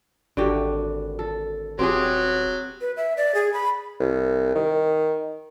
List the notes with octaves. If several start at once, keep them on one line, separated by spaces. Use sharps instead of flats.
G#1 D3 F#4 G4
A4
D#1 F#3 C4 G4 G#4
B4
E5
D5
G#4
B5
C2
D#3